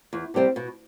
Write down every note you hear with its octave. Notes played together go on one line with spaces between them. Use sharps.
E2
C3 G3 C4
B2